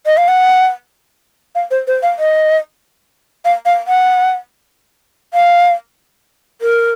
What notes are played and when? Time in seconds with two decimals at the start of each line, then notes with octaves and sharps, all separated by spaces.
0.06 D#5
0.17 F5
0.28 F#5
1.55 F5
1.71 C5
1.87 C5
2.03 F5
2.19 D#5
3.45 F5
3.66 F5
3.87 F#5
5.34 F5
6.61 A#4